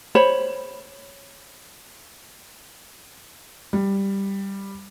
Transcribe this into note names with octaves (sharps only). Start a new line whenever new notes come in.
C5 C#5 B5
G3